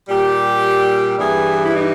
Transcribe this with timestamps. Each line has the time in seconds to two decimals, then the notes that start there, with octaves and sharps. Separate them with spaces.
0.09 A#2 G3 G4
1.18 G2 E3 G3 G#4
1.63 E4
1.72 D#4